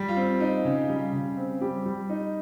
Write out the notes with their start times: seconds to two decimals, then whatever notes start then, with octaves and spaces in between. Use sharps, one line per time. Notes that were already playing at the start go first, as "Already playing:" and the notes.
Already playing: G3
0.08 F4
0.16 C4
0.40 D#4
0.65 C#3
0.89 G3
1.13 C#3
1.37 C4
1.61 G3 G4
1.86 G3
2.10 D#4